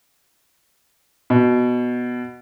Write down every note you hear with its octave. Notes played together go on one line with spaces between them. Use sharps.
B2